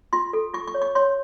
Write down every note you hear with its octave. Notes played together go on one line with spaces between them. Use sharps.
F4 C6
A4
F4 C#6
C#6
C#5
C#6
C#5 C6